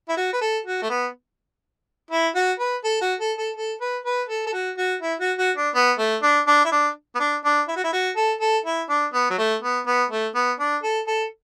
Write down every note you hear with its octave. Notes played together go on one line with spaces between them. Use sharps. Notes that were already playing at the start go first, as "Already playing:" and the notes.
E4
F#4
B4
A4
F#4
A3
B3
E4
F#4
B4
A4
F#4
A4
A4
A4
B4
B4
A4
A4
F#4
F#4
E4
F#4
F#4
D4
B3
A3
D4
D4
E4
D4
B3
D4
D4
E4
F#4
E4
F#4
A4
A4
E4
D4
B3
F#3
A3
B3
B3
A3
B3
D4
A4
A4